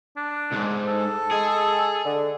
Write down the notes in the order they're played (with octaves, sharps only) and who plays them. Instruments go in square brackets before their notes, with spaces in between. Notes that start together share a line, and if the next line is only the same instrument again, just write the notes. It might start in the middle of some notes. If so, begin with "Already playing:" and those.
[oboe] D4
[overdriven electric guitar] C2 G#2
[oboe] A4
[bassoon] G#3 [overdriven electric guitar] G#4
[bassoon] D3